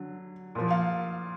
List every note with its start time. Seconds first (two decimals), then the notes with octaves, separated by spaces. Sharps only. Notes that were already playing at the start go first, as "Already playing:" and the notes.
Already playing: D3 F#3
0.55 A#2 F3
0.70 F5